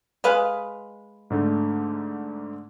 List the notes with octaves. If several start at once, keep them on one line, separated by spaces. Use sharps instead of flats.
G#3 B4 F5
G#2 D3 A3